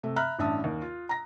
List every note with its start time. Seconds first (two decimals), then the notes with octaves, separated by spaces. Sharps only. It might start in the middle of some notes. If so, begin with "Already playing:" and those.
0.03 C3 A3
0.16 E5 A#5 B5 F6 F#6
0.39 A1 G2 E5 A5 D#6
0.64 D#2
0.82 F4
1.09 A#5 A#6